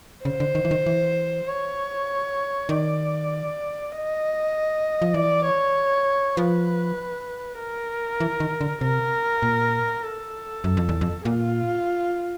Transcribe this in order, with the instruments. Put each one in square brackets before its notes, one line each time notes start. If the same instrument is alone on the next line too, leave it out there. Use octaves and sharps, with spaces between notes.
[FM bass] C#3 [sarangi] C5
[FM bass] D3
D#3
E3
D#3
E3
[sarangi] C#5
[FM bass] D#3 [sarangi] D5
[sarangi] D#5
[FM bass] F3
[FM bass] E3 [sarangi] D5
[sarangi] C#5
[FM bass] F3 [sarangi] B4
[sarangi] A#4
[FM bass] E3
D#3
D3
[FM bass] C3 [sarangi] A#4
[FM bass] A#2
[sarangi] A4
[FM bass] F#2
F2
E2
F2
[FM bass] A#2 [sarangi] F4